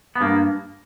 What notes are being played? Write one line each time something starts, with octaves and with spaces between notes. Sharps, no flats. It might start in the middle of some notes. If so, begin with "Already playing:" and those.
B3
G2 A#3